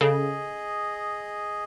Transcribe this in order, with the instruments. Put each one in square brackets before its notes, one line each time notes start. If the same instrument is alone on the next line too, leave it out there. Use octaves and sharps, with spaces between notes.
[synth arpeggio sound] C#3 [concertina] G#4 D#5 [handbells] A4